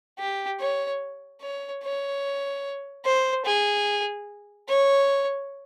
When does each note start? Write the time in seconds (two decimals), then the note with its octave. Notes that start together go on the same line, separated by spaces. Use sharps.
0.19 G4
0.60 C#5
1.41 C#5
1.83 C#5
3.05 C5
3.45 G#4
4.68 C#5